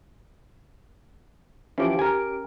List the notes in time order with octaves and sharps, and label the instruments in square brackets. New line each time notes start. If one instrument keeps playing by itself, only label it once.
[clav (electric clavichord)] E3 F3 [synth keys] C#4 G4 D7
[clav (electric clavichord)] A#4 G#5